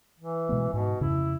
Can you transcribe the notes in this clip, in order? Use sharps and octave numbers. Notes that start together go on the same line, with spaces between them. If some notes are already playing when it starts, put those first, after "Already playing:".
E3
B2 G#3 B3
G#2 B2
F2 C#3 E4